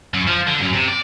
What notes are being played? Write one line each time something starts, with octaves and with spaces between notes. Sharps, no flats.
F#2
F3
D3
F#2
C3
D5